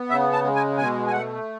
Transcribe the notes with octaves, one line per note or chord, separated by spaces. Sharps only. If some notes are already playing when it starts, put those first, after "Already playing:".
Already playing: B3
C#3 E5
A5
G#3
G#5
B2 G#5
G#5
A3 F#5